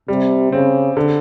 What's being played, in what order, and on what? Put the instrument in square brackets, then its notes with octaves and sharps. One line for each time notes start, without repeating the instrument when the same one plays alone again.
[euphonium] C3 [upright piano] G3
[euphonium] C#3 [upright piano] C4
[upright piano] D3